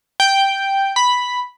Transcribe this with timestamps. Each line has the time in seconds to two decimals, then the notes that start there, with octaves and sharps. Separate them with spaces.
0.20 G5
0.96 B5